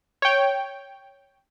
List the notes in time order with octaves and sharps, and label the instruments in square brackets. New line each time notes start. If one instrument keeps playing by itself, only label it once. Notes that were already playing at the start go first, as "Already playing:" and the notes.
[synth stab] C#5 G5